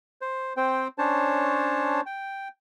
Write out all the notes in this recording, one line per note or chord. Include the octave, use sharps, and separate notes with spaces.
C5
C4 C5 G5
C#4 D4 C5 C#5 A5
G5